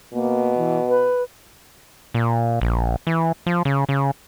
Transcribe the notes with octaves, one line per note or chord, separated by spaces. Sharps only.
B2 A#3
E3
B4
A#2
A#1
E3
F3
C#3
C#3